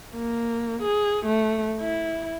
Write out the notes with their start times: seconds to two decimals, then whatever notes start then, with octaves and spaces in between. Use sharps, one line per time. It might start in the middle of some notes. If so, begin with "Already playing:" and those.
0.15 A#3
0.83 G#4
1.26 A3
1.81 E4